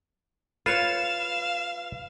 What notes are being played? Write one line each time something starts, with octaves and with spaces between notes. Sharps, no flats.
F4 B4 C#5 F5 E7